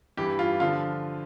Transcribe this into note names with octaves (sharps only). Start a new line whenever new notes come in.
G2 E3 G4
F4
D3 F3 F4